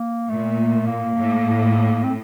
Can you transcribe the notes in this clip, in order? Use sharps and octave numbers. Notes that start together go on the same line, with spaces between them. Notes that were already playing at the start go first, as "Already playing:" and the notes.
Already playing: A#3
A#2 A3
A#3
A2
C4